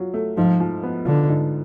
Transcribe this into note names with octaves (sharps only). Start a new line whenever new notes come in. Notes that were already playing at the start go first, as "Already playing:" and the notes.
Already playing: F#3 F4
A3
G#2 F3
F3
B3
D3 F4
G#2